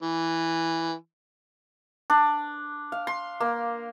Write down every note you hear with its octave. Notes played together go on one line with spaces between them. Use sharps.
E3
D4
F5
C6
A#3